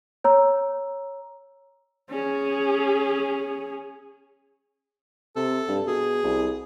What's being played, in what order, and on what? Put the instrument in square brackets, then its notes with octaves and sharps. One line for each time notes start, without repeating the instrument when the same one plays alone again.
[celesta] C#5 A#5 E6
[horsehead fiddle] C#4 G#4
[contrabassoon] C3 [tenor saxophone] A4
[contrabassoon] G2
[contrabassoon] B2 [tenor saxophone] G#4
[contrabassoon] C2